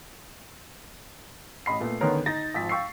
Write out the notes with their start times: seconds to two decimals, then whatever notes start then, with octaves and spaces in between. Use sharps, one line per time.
1.66 A1 D#5 B5 C7
1.80 A#2 A3 B3
2.01 D3 D#3 B3 C#4 A#4 C#5
2.26 D#4 A6 A#6
2.54 G#1 F3 B6
2.69 F5 G5 C#6 E6 C7